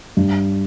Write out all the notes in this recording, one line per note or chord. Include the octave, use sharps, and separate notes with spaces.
G2